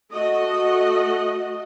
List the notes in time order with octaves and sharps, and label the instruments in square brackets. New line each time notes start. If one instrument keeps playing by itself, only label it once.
[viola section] A3 F#4 D#5